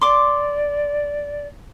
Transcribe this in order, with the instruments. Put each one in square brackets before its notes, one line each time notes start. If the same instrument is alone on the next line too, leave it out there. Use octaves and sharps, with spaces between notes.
[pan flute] D5 [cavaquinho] C6 D6